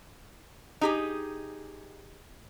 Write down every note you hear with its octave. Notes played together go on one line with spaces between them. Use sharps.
D#4 G4 G#4